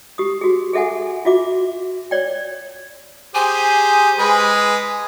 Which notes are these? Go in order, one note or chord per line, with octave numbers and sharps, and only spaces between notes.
G4 D#6
F#4 G#4
G#4 A4 E5 F#5 G#5
F4 F#4 E5 D6
C#5 D5 G5
G4 G#4 C5 G#5
G#3 G#4 B4